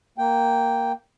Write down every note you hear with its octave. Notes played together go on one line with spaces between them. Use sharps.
A#3 G5